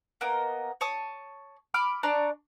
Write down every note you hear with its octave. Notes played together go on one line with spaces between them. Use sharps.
A#3 B3 A#4 D#5
C#5 A5 D#6
B5 D6 F6
D4 D5 A#5 C#6